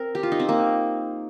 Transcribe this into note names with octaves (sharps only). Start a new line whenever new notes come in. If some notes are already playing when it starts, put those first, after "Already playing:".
Already playing: C4 A#4
G4
F4
D#4
C4
A#3